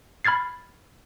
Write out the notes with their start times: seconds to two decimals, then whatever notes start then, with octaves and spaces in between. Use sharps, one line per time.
0.25 B5 F6 G#6 A6 C7